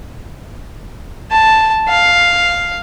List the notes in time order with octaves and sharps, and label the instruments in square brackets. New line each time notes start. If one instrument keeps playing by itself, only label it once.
[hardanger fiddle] A5
F5